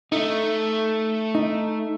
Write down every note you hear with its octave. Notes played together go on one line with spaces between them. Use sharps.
A3 D#4
D#4